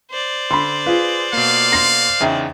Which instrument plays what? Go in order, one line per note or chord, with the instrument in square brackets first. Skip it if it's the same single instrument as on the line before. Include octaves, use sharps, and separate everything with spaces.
[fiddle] C5 D5
[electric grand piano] D3 [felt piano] B5 C6
[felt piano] F4 [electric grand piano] G#4 B4
[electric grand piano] B2 A#3 [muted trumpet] F5
[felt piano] C6 A#6 C7
[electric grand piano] E2 C#3 D#4 [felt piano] E5 G5